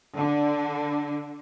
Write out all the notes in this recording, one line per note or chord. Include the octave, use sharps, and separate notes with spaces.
D3